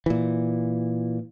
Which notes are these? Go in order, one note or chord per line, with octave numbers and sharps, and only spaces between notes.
A#2 E3